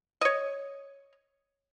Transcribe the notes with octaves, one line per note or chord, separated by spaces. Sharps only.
C#5 D#5